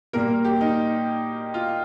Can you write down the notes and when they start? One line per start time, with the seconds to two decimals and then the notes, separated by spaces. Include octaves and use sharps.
0.13 A#2 G3 A#3 A#4
0.45 G4
0.61 D#4
1.54 F4